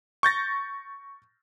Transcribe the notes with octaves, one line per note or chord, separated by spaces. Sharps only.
C#6 G6 A6 A#6